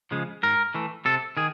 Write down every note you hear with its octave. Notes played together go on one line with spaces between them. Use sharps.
C#3 F3 G#3
G#2 A#4
E3 A3
C3 A4
D#3 G#4